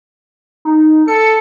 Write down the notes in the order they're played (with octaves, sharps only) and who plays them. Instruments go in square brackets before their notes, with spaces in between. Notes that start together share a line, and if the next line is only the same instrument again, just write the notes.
[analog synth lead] D#4
[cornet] A4 [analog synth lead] C#7